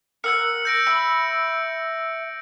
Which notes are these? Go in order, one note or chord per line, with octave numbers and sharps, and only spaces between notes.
A#4 F#5 E6 F#6 C#7
G6 A#6 D7
E5 B5